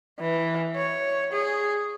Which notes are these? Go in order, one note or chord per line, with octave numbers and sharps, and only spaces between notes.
E3
C#5
G#4